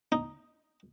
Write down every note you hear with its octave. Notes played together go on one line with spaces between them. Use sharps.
D#4